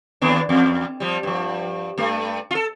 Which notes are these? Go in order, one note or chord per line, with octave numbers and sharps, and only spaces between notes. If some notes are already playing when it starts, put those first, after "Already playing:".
D#2 B3 D4
E2
F3 G3
G2 F3
G2 A3
F4 A4